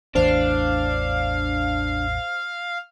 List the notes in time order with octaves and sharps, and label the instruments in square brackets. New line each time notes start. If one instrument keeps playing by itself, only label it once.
[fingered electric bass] A1 E2 [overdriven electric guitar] D4 [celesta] C5 [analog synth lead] F5